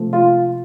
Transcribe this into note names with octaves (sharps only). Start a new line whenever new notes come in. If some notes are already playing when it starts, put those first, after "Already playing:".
Already playing: C3 F3 A3 C4
F4